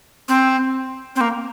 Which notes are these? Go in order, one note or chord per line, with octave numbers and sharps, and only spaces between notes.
C4
C4
A#3